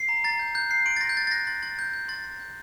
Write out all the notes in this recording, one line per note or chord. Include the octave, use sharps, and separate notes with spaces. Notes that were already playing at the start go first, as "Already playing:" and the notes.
Already playing: C7
A#5
A#5 A6
G6
F#6 G6
F#6 C7
C6 D7
A6
C6 A#6
G6
F#6 A6
A6
F#6 A#6
C6 A6
C6 A6
G6
G6
C6 A6
C6
G6